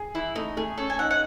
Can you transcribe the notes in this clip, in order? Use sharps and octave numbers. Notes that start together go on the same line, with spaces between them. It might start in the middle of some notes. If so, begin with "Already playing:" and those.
Already playing: G#4
E3 E4
A3 D#4
A3 G#4
C#4 A4
G#5
D#4 F#5
F#5